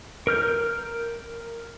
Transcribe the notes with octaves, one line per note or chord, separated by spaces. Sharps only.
A#4 F6 G6